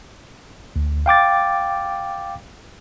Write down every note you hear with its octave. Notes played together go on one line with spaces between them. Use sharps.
D2
F5 G5 D6 A6